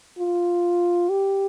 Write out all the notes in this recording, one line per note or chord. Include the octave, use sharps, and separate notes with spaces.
F4
G4